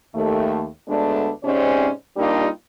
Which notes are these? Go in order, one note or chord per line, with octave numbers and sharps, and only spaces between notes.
D#2 A3
D2 G#3 A3 B3 D4
G#2 C3 C4 C#4 C5 D5
G3 A#3 D4 D#4 F4 G4